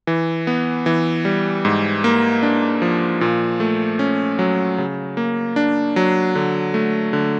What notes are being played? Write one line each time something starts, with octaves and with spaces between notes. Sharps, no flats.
E3
B3
E3
G3
G#2
A#3
D4
F3
A#2
A3
C#4
F#3
C#3
A#3
D4
F#3
D3
A3
D3